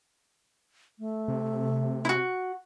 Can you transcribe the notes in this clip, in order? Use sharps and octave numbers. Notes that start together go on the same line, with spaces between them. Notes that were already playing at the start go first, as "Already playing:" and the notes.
A3
C3
E4 F#4